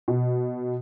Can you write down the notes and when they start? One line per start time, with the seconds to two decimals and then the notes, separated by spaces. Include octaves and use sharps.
0.08 B2